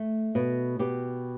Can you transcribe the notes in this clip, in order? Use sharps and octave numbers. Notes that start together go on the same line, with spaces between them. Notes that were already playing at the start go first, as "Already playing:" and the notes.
Already playing: A3
B2
B2 G4